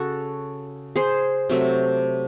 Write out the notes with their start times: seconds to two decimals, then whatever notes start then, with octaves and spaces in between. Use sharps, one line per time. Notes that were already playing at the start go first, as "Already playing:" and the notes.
Already playing: C#3 F#4 A4
0.96 G#4 C5
1.49 C3 F#3 A3